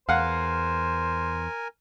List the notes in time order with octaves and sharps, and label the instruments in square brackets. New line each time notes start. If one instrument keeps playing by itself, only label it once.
[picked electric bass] E2 [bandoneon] A#4 G#5 [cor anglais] C5 [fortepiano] F5 F#5